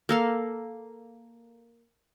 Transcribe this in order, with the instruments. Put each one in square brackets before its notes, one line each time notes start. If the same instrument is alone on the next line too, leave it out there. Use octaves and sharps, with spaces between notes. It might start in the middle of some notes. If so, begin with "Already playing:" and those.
[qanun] A#3 A4 F5